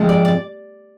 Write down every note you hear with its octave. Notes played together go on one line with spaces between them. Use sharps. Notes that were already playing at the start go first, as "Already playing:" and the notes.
Already playing: F2 C3 F3 G#3 C4
D5
D5